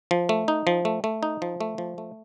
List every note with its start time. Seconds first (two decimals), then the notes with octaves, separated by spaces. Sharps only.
0.11 F3
0.29 A3
0.48 D#4
0.67 F3
0.85 A3
1.04 A3
1.23 D#4
1.42 F3
1.61 A3
1.78 F3
1.98 A3